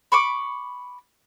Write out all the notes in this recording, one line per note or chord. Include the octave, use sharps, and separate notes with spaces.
B5 C#6 D6